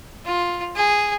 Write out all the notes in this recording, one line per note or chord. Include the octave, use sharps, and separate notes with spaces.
F4
G#4